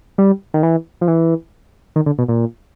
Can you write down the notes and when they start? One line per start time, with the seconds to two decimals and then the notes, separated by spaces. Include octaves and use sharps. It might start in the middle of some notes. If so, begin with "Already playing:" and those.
0.18 G3
0.54 D#3
0.63 E3
1.01 F3
1.08 E3
1.96 D#3
2.06 D3
2.18 B2
2.28 A#2